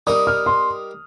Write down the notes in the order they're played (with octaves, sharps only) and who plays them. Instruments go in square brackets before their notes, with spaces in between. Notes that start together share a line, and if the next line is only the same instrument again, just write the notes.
[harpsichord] G3 D#4 A#4 [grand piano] D#6
[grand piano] F6
C6